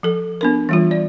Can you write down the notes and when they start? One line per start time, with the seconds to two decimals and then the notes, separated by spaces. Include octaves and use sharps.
0.03 F3 A4
0.41 B3 D4 A#4
0.69 E3 G3 F4
0.91 D5